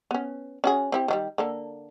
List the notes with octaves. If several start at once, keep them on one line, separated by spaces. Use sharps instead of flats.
B3 C#4
C#4 F#4 G#4
C4 E4 G4
D#3 F#3 G3
D3 A#3 A4